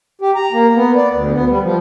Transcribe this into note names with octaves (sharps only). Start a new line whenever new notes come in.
G4
A#5
A#3
B3
D5
D2
B3
G3
F3